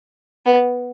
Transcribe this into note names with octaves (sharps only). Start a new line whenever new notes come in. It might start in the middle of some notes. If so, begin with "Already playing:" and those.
B3